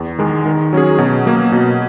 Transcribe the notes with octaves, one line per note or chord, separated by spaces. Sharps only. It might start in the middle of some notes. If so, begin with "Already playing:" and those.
Already playing: E2
D#3 G#3
D#3
F#3 C#4 G#4
B2
F#3 A#3
B2